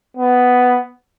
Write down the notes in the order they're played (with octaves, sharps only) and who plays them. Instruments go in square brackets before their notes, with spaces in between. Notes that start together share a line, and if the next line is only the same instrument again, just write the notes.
[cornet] B3